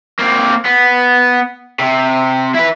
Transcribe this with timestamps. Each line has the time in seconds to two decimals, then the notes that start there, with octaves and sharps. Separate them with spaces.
0.19 A#3 C4
0.65 B3
1.79 C3
2.54 E4 B4